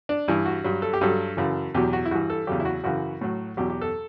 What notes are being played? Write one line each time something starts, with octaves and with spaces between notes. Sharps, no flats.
D4
G2 E3 E4
F#4
G2 F#3
A4
G4
G2 F#3 A4
F#2 C#3 E3
E2 B2 F#3 G4
F#4
E4
G2 E3 F#4
A4
E2 C#3 F#3 G4
E4
F#4
F#2 C#3 E3 F#4
A2 F#3
E2 B2 F#3 G4
G4
A4